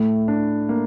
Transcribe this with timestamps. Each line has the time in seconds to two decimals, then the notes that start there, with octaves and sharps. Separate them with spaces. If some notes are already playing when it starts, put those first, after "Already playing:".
Already playing: A2 A3
0.28 D4
0.69 A#3